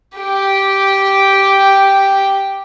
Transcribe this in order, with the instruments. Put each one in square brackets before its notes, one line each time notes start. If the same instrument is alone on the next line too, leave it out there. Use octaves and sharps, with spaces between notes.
[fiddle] G4 G5